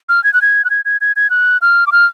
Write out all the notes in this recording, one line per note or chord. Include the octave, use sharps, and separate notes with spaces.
F6
G#6
F#6
G#6
F#6
G#6
G#6
G#6
G#6
F#6
F6
D6
F6